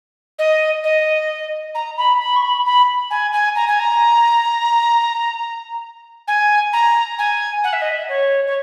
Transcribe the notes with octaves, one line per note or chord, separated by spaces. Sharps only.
D#5
D#5
A#5
B5
B5
C#6
B5
B5
G#5
G#5
A#5
G#5
A#5
G#5
A#5
G#5
F#5
E5
D#5
E5
C#5
C#5